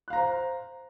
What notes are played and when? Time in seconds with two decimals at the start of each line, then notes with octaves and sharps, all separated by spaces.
0.08 F#6
0.10 F5
0.13 A#5
0.16 C5